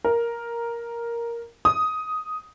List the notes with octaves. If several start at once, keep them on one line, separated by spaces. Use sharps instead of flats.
A#4
D#6